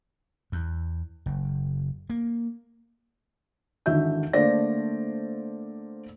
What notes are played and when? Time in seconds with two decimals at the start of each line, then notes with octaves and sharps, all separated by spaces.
0.52 E2
1.26 F#1
2.10 A#3
3.86 G#1 D3 E3 F#4 E5 G6
4.33 D3 A3 A#3 C5 D5 A#6